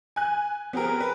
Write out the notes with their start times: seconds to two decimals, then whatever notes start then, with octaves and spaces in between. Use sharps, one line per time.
0.16 G#5 F#6
0.73 B3 C4 G4 G#4 A#4
1.00 B4